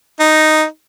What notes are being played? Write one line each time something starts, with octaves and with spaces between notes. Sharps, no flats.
D#4